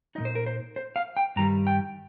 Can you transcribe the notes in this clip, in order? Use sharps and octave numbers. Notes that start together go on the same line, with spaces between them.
A#2 G3 D#4 D#5
C5
A#4
C5
C5
F5
G5
G2 D#3 G3 A#5
G5